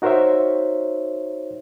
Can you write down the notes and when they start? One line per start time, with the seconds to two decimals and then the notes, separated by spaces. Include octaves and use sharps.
0.02 D#4 F#4 A#4 C5 C#5 E5